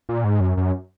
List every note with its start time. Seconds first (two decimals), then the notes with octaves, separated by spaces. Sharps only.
0.09 A#2
0.24 G#2
0.40 F#2
0.57 F#2